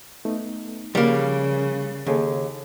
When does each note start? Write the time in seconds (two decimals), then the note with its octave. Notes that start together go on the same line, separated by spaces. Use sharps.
0.25 A3 B3 D#4
0.95 C#3 F3 G3 A#3
2.07 D#2 C#3 G#4 A4